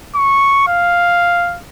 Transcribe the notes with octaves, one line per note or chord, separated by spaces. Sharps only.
C#6
F5